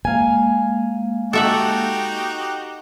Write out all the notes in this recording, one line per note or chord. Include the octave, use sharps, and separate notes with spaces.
G#3 A#3 F5 G#5
D#4 F#4 G4 A4 E5 F#5